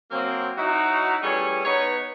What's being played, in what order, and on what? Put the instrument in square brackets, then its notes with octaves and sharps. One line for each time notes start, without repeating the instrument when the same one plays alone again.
[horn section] F#3 A#3 C4
F#3 D#4 E4 F#4
E3 G3 A3 C#4 G#4 C#5
B3 D#4 B4 C#5